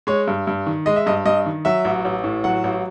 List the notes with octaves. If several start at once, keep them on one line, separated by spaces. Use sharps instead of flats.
G#3 C#5
G2
G2
D#3
G#3 D#5
E5
G2 D#5
G2 D#5
D#3
F#3 E5
A1
A1
A2
F#3 F#5
A1